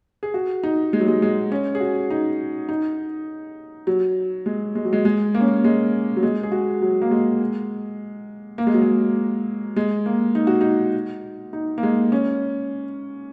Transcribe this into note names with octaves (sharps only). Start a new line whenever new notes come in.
G#4
F#4
D#4
G#3
F#3
G#3
G#3
C#4
G#4
F#4
D#4
D#4
F#3
G#3
G#3
F#3
G#3
G#3
A#3
C#4
A#3
G#3
F#3
G#3
G#4
F#4
F#3
A#3
G#3
A#3
G#3
F#3
G#3
G#3
A#3
D#4
F#4
D#4
D#4
A#3
G#3
C#4